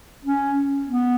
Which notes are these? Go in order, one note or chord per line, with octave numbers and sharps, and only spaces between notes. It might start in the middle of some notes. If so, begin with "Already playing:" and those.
C#4
B3